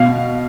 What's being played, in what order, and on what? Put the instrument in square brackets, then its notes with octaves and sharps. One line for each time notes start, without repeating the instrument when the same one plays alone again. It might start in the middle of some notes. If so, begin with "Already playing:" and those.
Already playing: [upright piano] B2 F5